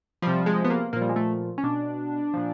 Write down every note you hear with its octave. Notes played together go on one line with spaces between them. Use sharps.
C3 F3 G3
G#3
B3
A#3
A#2 F3 A#3
G3
G#3
A3
C#4
B2 D4
A#2 F3